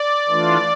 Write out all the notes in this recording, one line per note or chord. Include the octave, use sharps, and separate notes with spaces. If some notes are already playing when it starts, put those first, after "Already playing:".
Already playing: D5
E3 A3 D4 F4